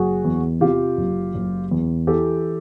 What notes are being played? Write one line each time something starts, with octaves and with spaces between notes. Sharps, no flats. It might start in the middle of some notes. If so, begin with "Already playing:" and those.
Already playing: F#1 F#4 G#4
E2
C3 F4 G4
F#1
F#1
E2
E3 G4 A4